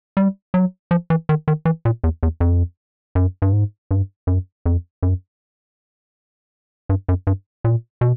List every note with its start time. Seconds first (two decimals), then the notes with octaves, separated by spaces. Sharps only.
0.17 G3
0.54 F#3
0.91 F3
1.10 E3
1.29 D#3
1.48 D#3
1.65 E3
1.85 A#2
2.04 E2
2.23 E2
2.40 F2
3.15 F#2
3.42 G2
3.53 G#2
3.91 G2
4.27 F#2
4.66 F2
5.03 F#2
6.89 G2
7.09 F#2
7.27 G2
7.64 A#2
8.01 B2